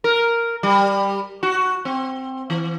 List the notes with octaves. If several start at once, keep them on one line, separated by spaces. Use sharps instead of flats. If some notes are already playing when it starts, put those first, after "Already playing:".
A#4
G3
F#4
C4
E3